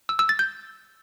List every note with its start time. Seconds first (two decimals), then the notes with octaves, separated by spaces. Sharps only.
0.09 E6
0.19 E6
0.29 A6
0.39 G6